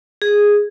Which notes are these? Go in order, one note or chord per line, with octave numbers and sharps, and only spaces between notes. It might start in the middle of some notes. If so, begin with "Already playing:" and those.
G#4